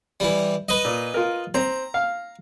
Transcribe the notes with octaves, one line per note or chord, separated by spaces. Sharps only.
E3 G3
B4 D#5
A#2
F4 A#4
C4 A#5
F5